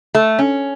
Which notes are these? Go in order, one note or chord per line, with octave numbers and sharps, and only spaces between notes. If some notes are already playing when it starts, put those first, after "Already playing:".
A3
C#4